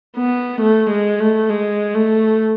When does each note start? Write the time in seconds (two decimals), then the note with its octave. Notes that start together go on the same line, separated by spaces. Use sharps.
0.17 B3
0.61 A3
0.90 G#3
1.20 A3
1.49 G#3
1.94 A3